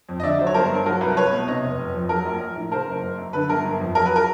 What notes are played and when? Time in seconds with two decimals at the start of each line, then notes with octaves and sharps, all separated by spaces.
0.09 F2
0.20 D#5
0.23 D3 D5 E5
0.39 F#3 C5
0.47 C#5
0.54 G1 A#4 C5
0.70 G2
0.86 F#3 A#4
1.01 C2 B4
1.17 C2 B4 C#5
1.33 B2
1.48 C3 C#5 D#5
1.64 F1
1.79 F1
1.95 F2
2.09 F#3 A#4
2.25 A#1
2.41 A#1
2.57 A2
2.72 C#3 A#4 C5
2.87 F#1
3.03 F#1
3.18 F#2
3.33 D3 B4
3.49 G1 A#4
3.64 G1
3.80 F2
3.95 F#3 A#4
4.06 B4
4.16 A#4